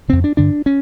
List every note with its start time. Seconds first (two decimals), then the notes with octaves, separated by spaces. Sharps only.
0.08 F2 C#3 C4
0.24 D4
0.37 G2 D3 D4
0.66 C#4